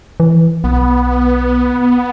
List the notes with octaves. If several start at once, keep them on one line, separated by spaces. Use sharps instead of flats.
E3
B1 B3